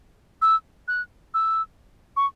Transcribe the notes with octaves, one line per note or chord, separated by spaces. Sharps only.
E6
F#6
E6
C#6